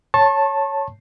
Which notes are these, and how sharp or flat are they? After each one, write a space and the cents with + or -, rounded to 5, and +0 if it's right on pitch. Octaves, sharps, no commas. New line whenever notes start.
C#5 +0 A5 +0 C#6 -40